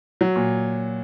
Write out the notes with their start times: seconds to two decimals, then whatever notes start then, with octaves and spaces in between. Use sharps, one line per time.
0.21 F#3
0.36 A#2